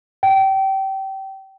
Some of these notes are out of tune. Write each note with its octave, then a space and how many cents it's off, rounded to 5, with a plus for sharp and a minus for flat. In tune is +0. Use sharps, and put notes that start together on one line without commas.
G5 -25